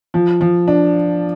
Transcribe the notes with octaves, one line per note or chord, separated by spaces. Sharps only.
F3
F3
D4